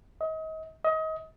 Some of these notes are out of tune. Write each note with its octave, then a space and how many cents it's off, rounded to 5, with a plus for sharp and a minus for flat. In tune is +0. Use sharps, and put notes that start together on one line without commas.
D#5 +35
D#5 +30